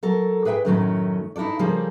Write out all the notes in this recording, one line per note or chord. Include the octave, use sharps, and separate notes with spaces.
F#3 A4 A#4
G#4 B4 E5 F#5 G5
F#2 A2 D#3 F#3 A3 C#4
D#4 E4 F#4 A4 D5
C#3 F3 G3 A#3 G#4 A4